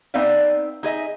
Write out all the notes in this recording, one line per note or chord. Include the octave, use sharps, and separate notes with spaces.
B3 C4 D#4 D5 E5 F5
D#4 G#4 D#5 E5